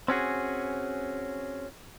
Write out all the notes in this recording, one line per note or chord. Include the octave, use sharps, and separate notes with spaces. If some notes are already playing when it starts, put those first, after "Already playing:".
C4 C#4 F#4 G#4